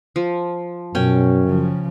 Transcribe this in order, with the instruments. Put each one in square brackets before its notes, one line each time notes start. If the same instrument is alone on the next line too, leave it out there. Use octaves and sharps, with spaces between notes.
[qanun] F3
[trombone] F#2 [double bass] B2 [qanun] C#4 G5
[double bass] C#3 F3